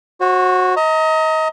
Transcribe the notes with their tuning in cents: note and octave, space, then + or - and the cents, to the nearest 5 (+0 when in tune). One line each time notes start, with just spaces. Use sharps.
F#4 -10 C5 +40
D#5 +30 A#5 -20